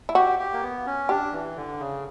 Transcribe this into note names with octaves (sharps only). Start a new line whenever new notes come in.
E4
F#4 G4
G4
A#3
B3
C#4
D4 G4
E3
D3
C#3